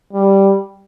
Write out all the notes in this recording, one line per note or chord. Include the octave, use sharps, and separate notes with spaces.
G3